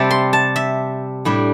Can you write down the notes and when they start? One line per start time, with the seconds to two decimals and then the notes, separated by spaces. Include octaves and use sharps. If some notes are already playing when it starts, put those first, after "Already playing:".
Already playing: C3 G3 C4 E5 G5 A5
0.11 C6
0.33 A5
0.56 E5
1.25 A2 G3 D4